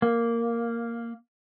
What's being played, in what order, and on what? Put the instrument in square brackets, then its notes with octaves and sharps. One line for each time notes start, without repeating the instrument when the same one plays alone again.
[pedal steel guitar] A#3